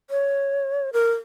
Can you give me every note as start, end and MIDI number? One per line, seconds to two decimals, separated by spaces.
0.10 0.90 73
0.93 1.11 70